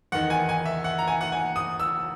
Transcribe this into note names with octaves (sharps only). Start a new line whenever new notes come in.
E2 D#3 F#5
G#5
G#5
E5
F#5
A#5
G#5
F#5
G#5
D#6
E6